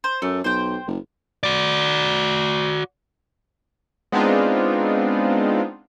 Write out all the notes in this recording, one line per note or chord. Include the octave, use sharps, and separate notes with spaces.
C5
F#2 A3
B1 C5 G5
F#1
F#4 D5
G#3 B3 C4 D4 D#4 F4